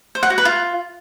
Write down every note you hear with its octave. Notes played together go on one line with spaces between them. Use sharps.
C5
F#5
F#4
B4
F4